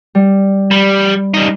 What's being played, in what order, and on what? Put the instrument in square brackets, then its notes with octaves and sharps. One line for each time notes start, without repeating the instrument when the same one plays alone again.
[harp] G3
[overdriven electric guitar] G3 [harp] B5
[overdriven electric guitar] G3 D#4